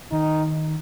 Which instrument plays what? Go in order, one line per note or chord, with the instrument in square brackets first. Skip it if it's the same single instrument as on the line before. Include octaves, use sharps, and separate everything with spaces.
[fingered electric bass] D#3 [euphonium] D#4